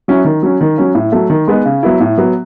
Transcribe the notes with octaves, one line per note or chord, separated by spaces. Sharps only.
F#3 C#4 E4
D#3
F#3 C#4
D#3
F#3 C#4
A2
F#3 A3
D#3
G#3 B3 D#4
C#3
F#3 B3 E4
A2
F#3 B3